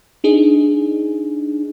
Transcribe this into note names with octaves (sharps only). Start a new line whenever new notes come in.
D4 D#4 G#4